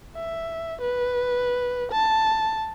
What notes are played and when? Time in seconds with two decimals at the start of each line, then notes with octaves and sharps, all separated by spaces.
0.15 E5
0.81 B4
1.92 A5